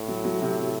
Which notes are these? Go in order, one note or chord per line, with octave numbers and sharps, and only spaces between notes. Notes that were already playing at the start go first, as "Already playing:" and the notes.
Already playing: A2
F#3
F#3
C3